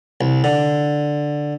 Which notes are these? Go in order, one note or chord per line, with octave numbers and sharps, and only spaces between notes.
C2
D3